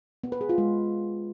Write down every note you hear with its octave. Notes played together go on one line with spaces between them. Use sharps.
B3
B4
G#4
F4
G#3